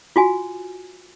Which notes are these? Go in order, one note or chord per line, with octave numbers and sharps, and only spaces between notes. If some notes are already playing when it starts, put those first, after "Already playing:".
F4 F#4 G#5